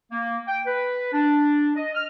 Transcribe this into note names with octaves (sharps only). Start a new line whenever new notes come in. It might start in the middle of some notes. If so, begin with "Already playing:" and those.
A#3
G5
B4
D4
D#5
F6